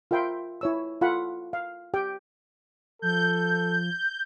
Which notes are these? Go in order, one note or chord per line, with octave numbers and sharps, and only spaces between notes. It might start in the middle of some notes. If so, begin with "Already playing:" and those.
F4 A#4 E5 G5 B5 C6
E4 C#5 E6
F4 A4 F5 F#5 B5
F5
G4 G5
F3 A4 G6